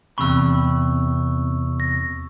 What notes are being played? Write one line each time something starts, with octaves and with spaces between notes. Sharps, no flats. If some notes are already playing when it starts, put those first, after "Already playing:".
E2 C3 B5 C#6 E6
A#6